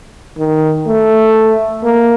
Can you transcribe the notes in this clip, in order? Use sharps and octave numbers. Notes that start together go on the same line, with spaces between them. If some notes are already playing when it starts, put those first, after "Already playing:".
D#3
A3
A#3